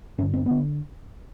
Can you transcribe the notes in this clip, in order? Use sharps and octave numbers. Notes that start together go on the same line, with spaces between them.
G2 D3 C#4
C4
D3 B3